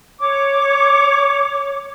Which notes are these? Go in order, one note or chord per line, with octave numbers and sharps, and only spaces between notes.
C#5 D6